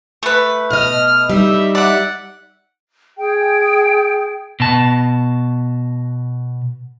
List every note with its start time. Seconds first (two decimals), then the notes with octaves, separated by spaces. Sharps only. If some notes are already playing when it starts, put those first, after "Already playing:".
0.23 A3 B4
0.70 B2 D#5 F6
1.30 G3 D#4 E5
1.75 D5 E5 F#5
3.17 G#4 G5
4.60 B2 A5